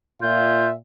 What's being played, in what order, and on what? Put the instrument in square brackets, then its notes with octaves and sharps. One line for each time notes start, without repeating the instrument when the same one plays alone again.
[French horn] A#2 [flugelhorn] F4 [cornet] E5 [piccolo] G6